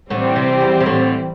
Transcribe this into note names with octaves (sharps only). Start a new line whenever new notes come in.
A2 D3 E3 G3 C4
C3
E2
C3
A2 D3